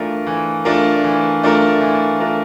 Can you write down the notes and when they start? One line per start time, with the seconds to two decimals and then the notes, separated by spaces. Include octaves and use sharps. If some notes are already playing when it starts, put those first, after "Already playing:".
Already playing: E3 A3 D4 F4 A#4
0.27 E3
0.65 A3 D4 F4 A#4
1.04 E3
1.43 A3 D4 F4 A#4
1.81 E3
2.20 A3 D4 F4 A#4